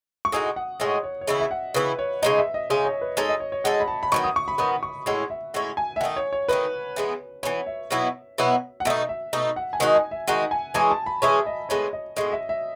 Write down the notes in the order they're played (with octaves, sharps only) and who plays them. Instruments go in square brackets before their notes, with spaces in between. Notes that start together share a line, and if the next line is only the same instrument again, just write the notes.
[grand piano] C#6
[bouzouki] A2 G#3 D#4 F#4 [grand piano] D#6
[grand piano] F#5
[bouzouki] A2 G#3 D#4 F#4 [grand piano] C#5
[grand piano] C#5
C#5
[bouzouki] C#3 E3 B3 E4 [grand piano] D#5
[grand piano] E5
F#5
[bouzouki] C#3 E3 B3 E4 [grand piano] B4
[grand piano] C#5
[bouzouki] C#3 G#3 D#4 [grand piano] D#5
[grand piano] E5
D#5
[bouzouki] C#3 G#3 D#4 [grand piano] C#5
[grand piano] C#5
B4
[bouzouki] G#3 D#4 A4 [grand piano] C#5
[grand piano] D#5
C#5
C#5
[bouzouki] G#3 D#4 A4 [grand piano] F#5
[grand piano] B5
A5
B5
[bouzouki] D#3 F#3 B3 [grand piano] C#6
[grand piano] D#6
C#6
B5
[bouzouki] D#3 F#3 B3 [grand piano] D#6
[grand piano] C#6
[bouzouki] A2 G#3 C#4 E4 [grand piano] F#5
[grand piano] E5
[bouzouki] A2 G#3 C#4 E4 [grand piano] F#5
[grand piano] G#5
E5
[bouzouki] D#3 A3 D#4 [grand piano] F#5
[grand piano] C#5
C#5
[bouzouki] D#3 A3 D#4 [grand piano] B4
[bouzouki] E3 G#3 B3
[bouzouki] E3 G#3 B3 [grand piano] C#5
[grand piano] E5
[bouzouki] B2 F#3 B3 E4
B2 F#3 B3 E4
[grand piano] F#5
[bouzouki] B2 A3 D#4 [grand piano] E5
[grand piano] E5
[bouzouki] B2 A3 D#4
[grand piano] F#5
G#5
[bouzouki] D#3 G#3 D#4 F#4 [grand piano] F#5
[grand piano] G#5
E5
[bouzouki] D#3 G#3 D#4 F#4 [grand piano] F#5
[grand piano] G#5
[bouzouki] E3 G#3 C#4 G#4 [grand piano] G#5
[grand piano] A5
B5
[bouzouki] E3 G#3 C#4 G#4 [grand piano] E5
[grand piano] D#5
[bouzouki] A2 G#3 B3 [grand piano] C#5
[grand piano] D#5
[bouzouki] A2 G#3 B3 [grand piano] D#5
[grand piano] E5
E5